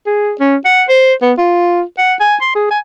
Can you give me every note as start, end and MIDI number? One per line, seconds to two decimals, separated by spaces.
0.07 0.34 68
0.40 0.56 61
0.65 0.83 78
0.89 1.13 72
1.22 1.33 59
1.38 1.82 65
1.98 2.14 78
2.20 2.36 80
2.42 2.52 84
2.56 2.67 68
2.71 2.79 80